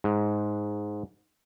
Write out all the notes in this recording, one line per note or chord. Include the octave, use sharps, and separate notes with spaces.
G#2